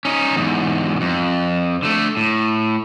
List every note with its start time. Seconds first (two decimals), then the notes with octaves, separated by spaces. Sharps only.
0.05 C#4 D#4
0.36 E2 G#2
1.01 F2
1.83 D3 A3
2.17 A2